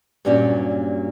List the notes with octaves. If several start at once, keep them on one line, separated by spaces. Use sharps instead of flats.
G2 A#2 F#3 G3 C#4 F#4